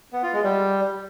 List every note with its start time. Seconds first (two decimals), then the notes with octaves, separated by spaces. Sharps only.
0.13 B3
0.23 F4
0.33 G#3
0.44 G3